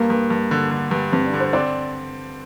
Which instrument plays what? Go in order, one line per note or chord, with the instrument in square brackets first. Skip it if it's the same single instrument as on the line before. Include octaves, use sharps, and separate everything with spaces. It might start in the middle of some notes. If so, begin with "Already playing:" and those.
Already playing: [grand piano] G2 [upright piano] A#3
[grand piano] G2
G2
D3
D3
G2
[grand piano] G2 [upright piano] C4
[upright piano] D4
[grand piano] D3
[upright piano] C5
[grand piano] C4 [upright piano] D5